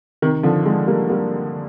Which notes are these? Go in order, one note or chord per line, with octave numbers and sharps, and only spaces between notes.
C3 D#3
D3 F3
F3 G#3
G3 A#3
G3 A#3